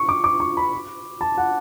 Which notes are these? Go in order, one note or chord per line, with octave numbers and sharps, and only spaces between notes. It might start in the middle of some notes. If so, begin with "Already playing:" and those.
Already playing: C#6
D6
D6
C#6
B5
A5
F#5